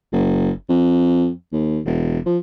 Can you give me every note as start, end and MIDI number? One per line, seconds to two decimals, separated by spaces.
0.12 0.50 30
0.69 1.29 41
1.52 1.80 39
1.85 2.19 28
2.26 2.38 53